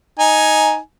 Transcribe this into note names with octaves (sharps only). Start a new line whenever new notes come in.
D#4 G#5